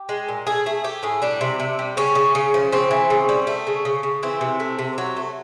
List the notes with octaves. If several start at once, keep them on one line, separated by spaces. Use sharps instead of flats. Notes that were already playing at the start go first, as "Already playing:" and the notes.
Already playing: G4
G#3
A#2
A3 G#4
A3 G#4
A3 G4
A2 G#4
G3 D4
C3
C3
G3
C#3 C#4
C#3
C#3
F3
C#3 C4
E3
C#3
G3
A3
C#3
C#3
C#3
E3 C4
C3
A3
C3
F#3
A3